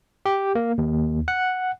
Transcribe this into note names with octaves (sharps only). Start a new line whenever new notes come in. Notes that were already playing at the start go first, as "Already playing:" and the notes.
G4
A#3
D#2
F#5